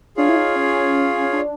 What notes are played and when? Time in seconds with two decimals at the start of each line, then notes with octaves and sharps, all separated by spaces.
0.17 D4 F4 G#4 C#5 F5
0.29 E4
0.36 D#4
0.56 C#4
1.33 D4